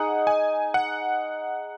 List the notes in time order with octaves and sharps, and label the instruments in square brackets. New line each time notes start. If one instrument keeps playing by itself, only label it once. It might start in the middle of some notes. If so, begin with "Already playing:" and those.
Already playing: [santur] D#4 G#4 D#5 [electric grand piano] F#5
[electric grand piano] G#5
F#5